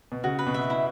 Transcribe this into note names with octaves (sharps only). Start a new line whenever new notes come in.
B2
C#3 F#4
B4
B2
E5
E4